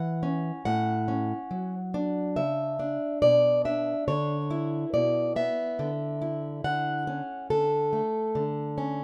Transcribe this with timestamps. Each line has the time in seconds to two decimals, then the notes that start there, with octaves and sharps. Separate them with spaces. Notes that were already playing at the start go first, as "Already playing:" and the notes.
Already playing: E3 F#5
0.23 C#4
0.65 A2 F#5
1.08 C#4
1.51 F#3
1.94 D4
2.36 C#3 E5
2.79 D4
3.22 B2 D5
3.65 D4 E5
4.08 D3 C#5
4.50 E4
4.94 B2 D5
5.36 B3 E5
5.79 D3
6.22 E4
6.64 D3 F#5
7.07 C#4
7.50 D3 A4
7.93 A3
8.35 D3
8.78 C#4